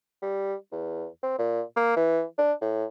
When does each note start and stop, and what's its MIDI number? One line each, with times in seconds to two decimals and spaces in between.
0.22 0.54 55
0.72 1.06 40
1.23 1.36 60
1.39 1.61 46
1.76 1.94 58
1.96 2.23 52
2.39 2.53 62
2.61 2.85 45